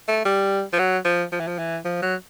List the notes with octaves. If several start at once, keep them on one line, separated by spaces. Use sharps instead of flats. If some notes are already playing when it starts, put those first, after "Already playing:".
A3
G3
F3
F#3
F3
F3
E3
F3
E3
F3
F#3